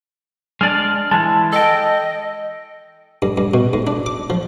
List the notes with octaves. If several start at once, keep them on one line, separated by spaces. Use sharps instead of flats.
G#3 D4 D5 F6
E3 G#3 A5
A4 D#5 G5
G2
G2
B2
G#2
D4
D6
F3